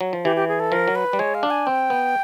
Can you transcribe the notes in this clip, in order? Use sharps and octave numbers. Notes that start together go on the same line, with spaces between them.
F#3
F3
E3 G4
G4
G#4
A4
F3 A#4
F#3
B4
G3
G#3 C#5
F5
D4
G#5
C4 G5
B3